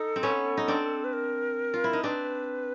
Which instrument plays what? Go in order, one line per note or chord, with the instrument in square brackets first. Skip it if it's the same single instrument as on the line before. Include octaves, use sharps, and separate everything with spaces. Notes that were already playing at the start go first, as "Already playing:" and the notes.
Already playing: [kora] D#4 [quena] A4
[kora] C4
B3 C#4
D#4
C4 D4
[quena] B4
A#4
[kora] F4
E4
D#4
[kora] C4 D4 [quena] B4